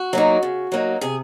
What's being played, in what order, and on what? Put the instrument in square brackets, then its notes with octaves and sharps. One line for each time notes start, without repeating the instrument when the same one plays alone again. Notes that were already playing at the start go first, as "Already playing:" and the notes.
Already playing: [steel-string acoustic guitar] F#4
F#3 A#3 D#4
C#3
F#3 A#3 D#4
C3 G#4